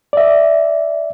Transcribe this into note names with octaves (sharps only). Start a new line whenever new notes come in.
D5 E5